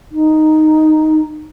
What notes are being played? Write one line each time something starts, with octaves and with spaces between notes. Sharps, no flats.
D#4